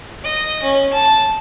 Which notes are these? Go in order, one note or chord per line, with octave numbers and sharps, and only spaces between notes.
D#5
C#4
A5